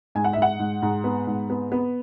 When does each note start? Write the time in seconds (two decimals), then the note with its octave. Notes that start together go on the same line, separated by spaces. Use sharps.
0.15 G#2 G#5
0.24 F#5
0.33 G#2 E5
0.42 F#5
0.59 G#2
0.82 G#2
1.04 B3
1.27 G#2
1.50 B3
1.72 B3